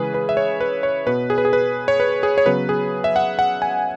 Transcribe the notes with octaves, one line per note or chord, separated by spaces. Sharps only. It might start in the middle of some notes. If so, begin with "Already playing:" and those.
Already playing: C#3 E3 G#3 C#4 G#4 B4
B4
E5
C#5
B4
C#5
B2 B3 B4
G#4
B4
G#4
B4
C#5
B4
G#4
C#5
C#3 F#3 B3 B4
G#4
E5
F#5
F#5
G#5